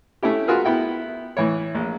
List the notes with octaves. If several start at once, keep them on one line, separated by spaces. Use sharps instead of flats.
A3 C#4 E4 G4
F4 F#4 G#4 A#4 B4
B3 E4 G5
A2 E3 E4 C#5
A#1